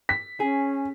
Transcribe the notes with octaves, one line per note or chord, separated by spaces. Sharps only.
B6
C#4 G#4